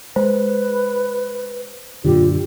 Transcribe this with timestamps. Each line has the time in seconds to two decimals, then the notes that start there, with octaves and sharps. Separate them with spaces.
0.16 G#3 B4 C5
2.05 F#2 A#2 D3 F4 G4